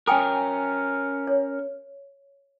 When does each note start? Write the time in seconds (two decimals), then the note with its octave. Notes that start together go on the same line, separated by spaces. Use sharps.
0.07 C#4 A#4 G5 G#5 D#6
1.27 C#5